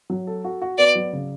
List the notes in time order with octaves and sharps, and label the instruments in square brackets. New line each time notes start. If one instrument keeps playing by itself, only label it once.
[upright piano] F#3
A4
F#4
F#4
[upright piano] B3 [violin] D5
[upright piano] F#3
C#3